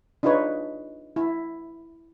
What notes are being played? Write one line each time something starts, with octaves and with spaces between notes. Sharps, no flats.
D4 D#4 F4 G#4 B4 C#5
E4